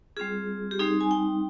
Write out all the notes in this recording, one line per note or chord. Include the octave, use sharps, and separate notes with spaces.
G3 C4 F4 G#4
G4
G3 C4 D#4 G#4
G#5
G5